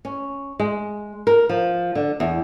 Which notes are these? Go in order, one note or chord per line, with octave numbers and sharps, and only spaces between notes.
C#4
G#3
A#4
F3
D3
E2